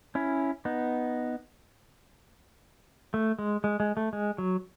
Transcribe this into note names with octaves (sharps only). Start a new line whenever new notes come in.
C#4 E4
B3 D#4
A3
G#3
G#3
G#3
A3
G#3
F#3